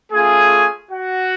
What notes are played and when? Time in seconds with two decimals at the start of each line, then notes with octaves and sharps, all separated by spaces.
0.11 A3 C#4 F4 G#4 G#5
0.91 F#4 F#5